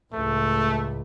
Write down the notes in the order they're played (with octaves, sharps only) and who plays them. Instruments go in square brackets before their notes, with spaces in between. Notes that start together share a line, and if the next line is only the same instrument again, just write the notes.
[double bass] C#2 A2 [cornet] A3